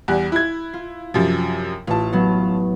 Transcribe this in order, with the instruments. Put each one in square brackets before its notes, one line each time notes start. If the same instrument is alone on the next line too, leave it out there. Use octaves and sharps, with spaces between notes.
[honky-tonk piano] E2 G3 F#6
E4 G#6
[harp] F4
[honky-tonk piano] F#2 C3 F3 [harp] A6
[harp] A1 [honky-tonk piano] F4 A5
[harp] F#3 B3